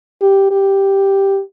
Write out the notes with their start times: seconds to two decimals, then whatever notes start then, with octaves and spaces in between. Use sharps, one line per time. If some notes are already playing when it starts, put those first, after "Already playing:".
0.22 G4
0.51 G4